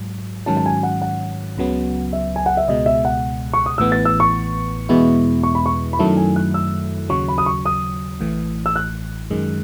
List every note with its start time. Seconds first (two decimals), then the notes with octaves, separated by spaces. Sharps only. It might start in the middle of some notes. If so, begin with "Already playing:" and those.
Already playing: G#2 F#3
0.46 G#2 D#3 F#3 C#4 A5
0.57 A5
0.66 G#5
0.83 F#5
1.02 F#5
1.57 C#2 C#3 F#3 B3
2.13 E5
2.36 G#5
2.46 F#5
2.57 E5
2.68 C#2 B2 G#3 D#5
2.86 E5
3.05 F#5
3.53 C#6
3.66 D#6
3.78 A1 A2 E3 B3 E6
3.92 A6
4.05 E6
4.20 C#6
4.89 E2 B2 G#3 B3 E4
5.43 C#6
5.55 B5
5.66 C#6
5.93 B5
5.99 F#2 D#3 F#3 A3 E4 A5
6.17 G#5
6.36 F#6
6.54 E6
7.09 D#2 C#3 F#3 C#6
7.28 B5
7.38 D#6
7.46 C#6
7.66 D#6
8.20 A1 A2 E3
8.66 E6
8.76 F#6
9.31 F#2 D#3 G#3